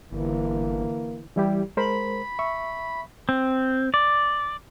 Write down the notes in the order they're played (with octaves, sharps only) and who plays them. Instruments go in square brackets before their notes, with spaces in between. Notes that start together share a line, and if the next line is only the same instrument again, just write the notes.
[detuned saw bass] G1 [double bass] D3 E3 [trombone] A#3
[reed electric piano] E3 E4 G4 [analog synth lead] G3
[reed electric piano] G#3 A#4 C5 [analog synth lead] B5
[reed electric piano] E5 C#6
[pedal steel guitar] C4
D5